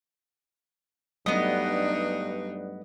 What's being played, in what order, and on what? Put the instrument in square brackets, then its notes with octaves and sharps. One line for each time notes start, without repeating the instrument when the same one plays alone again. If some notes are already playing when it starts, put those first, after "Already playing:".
[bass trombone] G2 [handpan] F#3 G3 A3 [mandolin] B3 D#5 [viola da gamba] D4 D#4